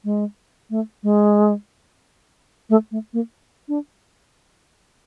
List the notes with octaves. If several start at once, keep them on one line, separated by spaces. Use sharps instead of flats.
G#3
A3
G#3
A3
A3
A#3
D4